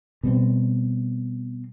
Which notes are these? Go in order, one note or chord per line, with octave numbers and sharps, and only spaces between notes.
B2 G3 C4